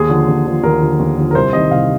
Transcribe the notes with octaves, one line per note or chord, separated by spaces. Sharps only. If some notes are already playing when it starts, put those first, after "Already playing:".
Already playing: D#2 G#4
D3 F3
D#2
D3 F3
D#2 A#4
D3 F3
D#2
D3 F3
A#4
C2 C5
C3 D#3 D#5
C2 F5